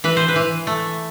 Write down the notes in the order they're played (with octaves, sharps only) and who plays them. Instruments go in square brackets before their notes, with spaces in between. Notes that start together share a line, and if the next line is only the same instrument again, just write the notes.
[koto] E3 B4
C5
B4
E3
A3